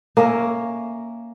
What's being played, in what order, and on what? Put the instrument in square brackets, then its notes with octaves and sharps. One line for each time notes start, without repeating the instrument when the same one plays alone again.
[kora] A#3 C#4 A#4 E5